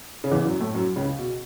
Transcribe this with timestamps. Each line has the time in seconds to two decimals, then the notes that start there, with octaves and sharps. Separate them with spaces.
0.24 C#3
0.31 E2 E3
0.45 F#2 F#3
0.60 A2 A3
0.75 F#2 F#3
0.96 C#2 C#3
1.18 B2